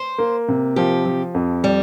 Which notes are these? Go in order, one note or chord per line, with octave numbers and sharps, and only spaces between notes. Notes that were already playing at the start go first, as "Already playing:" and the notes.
Already playing: C5
A#3
C3
F3 G4
F3
F2
G3